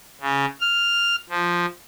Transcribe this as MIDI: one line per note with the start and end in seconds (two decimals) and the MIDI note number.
0.21 0.45 49
0.61 1.15 89
1.30 1.66 53